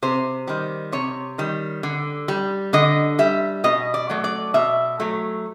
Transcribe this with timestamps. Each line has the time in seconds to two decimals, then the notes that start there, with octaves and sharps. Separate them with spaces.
0.02 C3 C5
0.48 D#3 G3
0.92 C3 C#5
1.38 D#3 G3
1.83 D3
2.28 G3
2.73 D3 D#5
3.19 G3 E5
3.64 B2 D#5
3.94 D5
4.10 F#3 A3
4.24 D5
4.54 B2 E5
5.00 F#3 A3